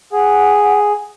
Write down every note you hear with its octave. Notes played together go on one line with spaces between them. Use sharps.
G#4 F#5